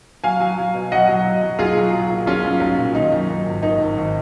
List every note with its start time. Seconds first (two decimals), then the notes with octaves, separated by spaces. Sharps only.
0.24 F#3 F5 G#5
0.40 F#3
0.58 F#3
0.75 B2
0.92 F#3 D#5 F#5
1.08 F#3
1.25 F#3
1.42 F#3
1.59 B1 F4 G#4
1.76 F#3
1.93 F#3
2.10 A#2
2.26 B1 C#4 F4
2.44 B1
2.60 B1
2.78 A#2
2.95 D#3 D#4
3.12 F#2
3.29 F#2
3.45 G#1
3.62 D#3 D#4
3.80 G#1
3.97 G#1